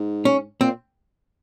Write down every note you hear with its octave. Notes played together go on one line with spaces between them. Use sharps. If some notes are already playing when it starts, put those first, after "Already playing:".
Already playing: G#2
C#4
A#2 C4